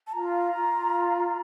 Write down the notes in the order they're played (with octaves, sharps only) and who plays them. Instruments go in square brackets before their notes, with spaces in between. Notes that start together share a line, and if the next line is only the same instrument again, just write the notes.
[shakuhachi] A5
[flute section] F4 [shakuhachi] A#5
[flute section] F4